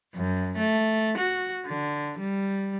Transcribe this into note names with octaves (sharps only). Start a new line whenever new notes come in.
F#2
A3
F#4
D3
G3